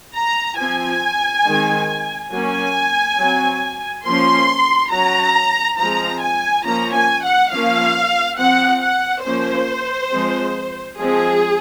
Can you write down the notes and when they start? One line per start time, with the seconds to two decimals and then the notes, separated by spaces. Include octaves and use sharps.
0.15 A#5
0.59 F3 C4 G#5
1.45 D#3 G#3 C4
2.31 F#3 A#3 C#4 G#5
3.18 F#3 C4
4.05 F3 A#3 C#4 C6
4.91 F#3 C#4 A#5
5.78 F3 G#3 C4 A#5
6.21 G#5
6.65 F3 A#3 C#4 A#5
6.93 G#5
7.23 F#5
7.51 F3 A#3 C#4 F5
8.38 F3 C4 F#5
8.82 F#5
9.24 F3 A#3 C#4 C5
10.11 F3 G#3 C4
10.97 F3 G#3 C4 G#4